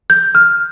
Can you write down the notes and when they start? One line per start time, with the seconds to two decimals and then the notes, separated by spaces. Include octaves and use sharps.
0.10 G6
0.35 F6